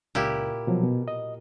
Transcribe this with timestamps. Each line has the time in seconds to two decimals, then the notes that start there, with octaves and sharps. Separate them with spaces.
0.15 C#2 A#2 E4 G4
0.67 B2 F3 F#3
0.84 B2
1.08 D#5